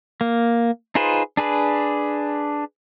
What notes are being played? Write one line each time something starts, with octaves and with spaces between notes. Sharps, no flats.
A#3
D#4 F4 G#4 B4 C5
D4 G#4 B4